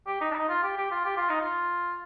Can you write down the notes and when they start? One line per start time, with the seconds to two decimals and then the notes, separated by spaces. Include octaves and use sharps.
0.06 G4
0.21 D#4
0.31 D4
0.35 D#4
0.49 F4
0.63 G4
0.77 G4
0.91 F4
1.05 G4
1.17 F4
1.29 D#4
1.41 F4